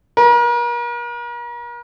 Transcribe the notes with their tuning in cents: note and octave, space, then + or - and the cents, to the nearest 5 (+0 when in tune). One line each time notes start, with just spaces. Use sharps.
A#4 +40